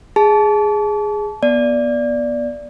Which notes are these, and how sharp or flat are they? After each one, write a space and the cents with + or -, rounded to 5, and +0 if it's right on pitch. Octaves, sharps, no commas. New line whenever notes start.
G#4 +0 A5 -25
B3 -20 D5 +0